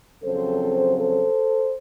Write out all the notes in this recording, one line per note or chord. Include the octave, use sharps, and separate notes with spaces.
F2 C#3 F#3 C4 A4 C5
A4 C5